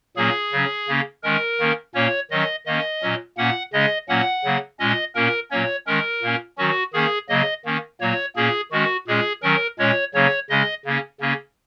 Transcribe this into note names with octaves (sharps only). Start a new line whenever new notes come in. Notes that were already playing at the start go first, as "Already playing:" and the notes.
A#2 F#3 A#3 C#4 G#4
C#3 F#3 C#4
C#3 A#3 C#4
D#3 G#3 C#4 A#4
D#3 A#3 C#4
A#2 A#3 C#4 C#5
D#3 F#3 C#4 D#5
D#3 A#3 C#4 D#5
A#2 F#3 C#4
A#2 A#3 C#4 F#5
C#3 G#3 C#4 D#5
A#2 F#3 A#3 C#4 F#5
C#3 F#3 A#3
A#2 G#3 C#4 D#5
A#2 A#3 C#4 A#4
A#2 F#3 A#3 C#4 C#5
D#3 G#3 C#4 A#4
A#2 A#3 C#4
D#3 F#3 C#4 F#4
D#3 A#3 C#4 G#4
C#3 F#3 A#3 D#5
D#3 A#3 C#4
A#2 F#3 A#3 C#5
A#2 A#3 C#4 G#4
D#3 G#3 C#4 F#4
A#2 G#3 C#4 G#4
D#3 F#3 C#4 A#4
A#2 G#3 C#4 C#5
C#3 F#3 A#3 C#4 C#5
C#3 G#3 C#4 D#5
C#3 A#3 C#4
C#3 A#3 C#4